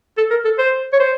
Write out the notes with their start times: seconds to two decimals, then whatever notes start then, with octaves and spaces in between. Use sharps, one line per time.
0.17 A4
0.31 A#4
0.45 A4
0.58 C5
0.93 C#5
1.00 C5